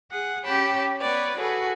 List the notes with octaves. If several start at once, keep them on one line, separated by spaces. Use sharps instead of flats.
G#4 F#5
C#4 G4 C#5 G5 A5 B5
B3 B4 C#5 D5
F#4 G#4 A4 B4